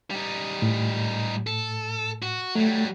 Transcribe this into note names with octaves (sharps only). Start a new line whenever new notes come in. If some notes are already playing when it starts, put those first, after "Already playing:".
G3 D#4
A2
A4
F#4
F#3 G3 A3